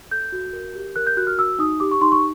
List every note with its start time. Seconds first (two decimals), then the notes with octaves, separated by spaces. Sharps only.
0.11 A4 G6
0.32 F#4
0.53 A#4
0.75 G4
0.96 A#4 F#6
1.07 G6
1.17 F#4 F#6
1.27 F6
1.38 F#4 E6
1.59 D#4 D#6
1.80 G4 D6
1.91 C#6
2.01 D#4 C6
2.12 C#6